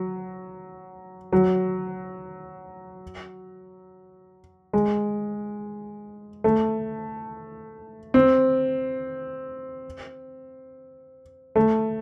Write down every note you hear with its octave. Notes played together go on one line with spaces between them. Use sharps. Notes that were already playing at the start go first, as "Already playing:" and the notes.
Already playing: F#3
F#3
G#3
A3
C4
A3